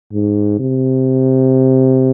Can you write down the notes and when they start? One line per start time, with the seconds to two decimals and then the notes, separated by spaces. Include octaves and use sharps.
0.13 G#2
0.59 C3